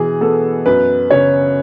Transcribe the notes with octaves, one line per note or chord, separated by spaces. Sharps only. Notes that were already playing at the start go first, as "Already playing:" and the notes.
Already playing: B2 E3 G#4
B3 A4
F#2 B4
C#3 C#5